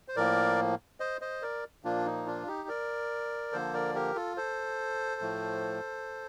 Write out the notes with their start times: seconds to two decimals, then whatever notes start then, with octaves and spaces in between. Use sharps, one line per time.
0.08 C5
0.16 A2 F3 A#3 A#4 D5
1.00 C5 D#5
1.21 C5 D#5
1.42 A#4 D5
1.84 A#2 F3 A#3 D4 F4
2.06 D#4
2.26 D4 F4
2.47 D#4 G4
2.68 A#4 D5
3.52 D3 F3 A#3 A4 C5
3.74 A#4 D5
3.95 G4 A#4
4.16 F4 A4
4.37 A4 C5
5.21 A2 F3 A3